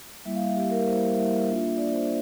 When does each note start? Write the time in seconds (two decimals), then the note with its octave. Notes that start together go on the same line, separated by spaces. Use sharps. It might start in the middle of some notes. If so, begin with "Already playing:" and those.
0.25 G3 A#3 E4 E5
0.35 F5
0.46 E5
0.56 G3 A#3 E4 G4
0.71 A#4
0.86 G3 A#3 E4 C5
1.16 G3 A#3 E4 E5
1.46 A#3 D4 F4
1.77 A#3 D4 F4 D5
1.92 C5